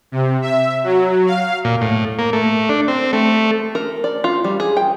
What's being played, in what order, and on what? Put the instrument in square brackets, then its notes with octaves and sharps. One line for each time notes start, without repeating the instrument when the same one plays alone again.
[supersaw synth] C3
E5
F#3
F5
[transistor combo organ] A#2
A2
A#3
A3
D4
C4
A3
[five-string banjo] A#4
D5
F4
G3
G#4
G5